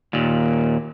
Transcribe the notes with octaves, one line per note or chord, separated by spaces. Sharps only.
D#2 A#2